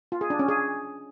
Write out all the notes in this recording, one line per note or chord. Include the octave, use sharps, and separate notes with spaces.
F4
G#4
D4
C#4
G#4